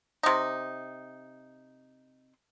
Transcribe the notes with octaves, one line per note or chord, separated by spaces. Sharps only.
C3 D#4